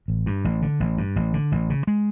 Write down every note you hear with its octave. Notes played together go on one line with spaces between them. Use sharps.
A1
G2
A1
D3
A1
G2
A1
D3
A1
C#3
G#3